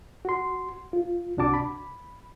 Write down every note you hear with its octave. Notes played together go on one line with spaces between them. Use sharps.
F#4 C6
F4
C2 C3 D4 F#4 A5 D6
B5